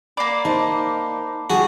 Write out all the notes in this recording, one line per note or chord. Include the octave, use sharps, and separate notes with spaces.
A#3 D5 B5 D6 C7
D#4 C5 A5
G3 D4 F#4 G#4